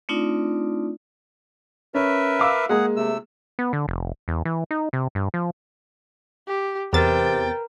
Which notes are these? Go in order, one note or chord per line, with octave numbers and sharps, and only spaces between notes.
A3 C4 D4 D#4 F4 D5
C#4 A#4 B4 E5
F5 D6 E6
G#3 A#3 G#4 F#5
C3 A3 E6
B3
D3
F1
E2
E3
D#4
C3
G2
F3
G4
E2 C3 A#4 B4 G5 A#5 A6